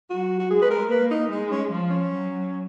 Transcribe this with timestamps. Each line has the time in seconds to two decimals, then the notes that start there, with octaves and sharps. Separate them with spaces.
0.10 F#3 F#4
0.40 F#4
0.50 G#3 G#4
0.62 B4
0.71 A#4
0.91 A#3 B4
1.11 D#4
1.30 G#3 D#4
1.51 C#4
1.71 F3
1.90 C#4
2.10 F#3